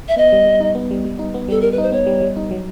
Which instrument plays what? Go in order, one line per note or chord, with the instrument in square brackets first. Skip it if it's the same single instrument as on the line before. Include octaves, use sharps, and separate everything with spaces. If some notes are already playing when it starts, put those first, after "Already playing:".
[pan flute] E5
[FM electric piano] B3 [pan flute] D#5
[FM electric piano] G3
G3
D#4
B3
G3
G3
D#4
B3
[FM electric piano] G3 [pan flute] A4
[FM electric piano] G3 [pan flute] A#4
[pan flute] B4
[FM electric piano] D#4 [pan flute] C5
[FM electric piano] B3 [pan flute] C#5
[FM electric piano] G3
G3
D#4
F#3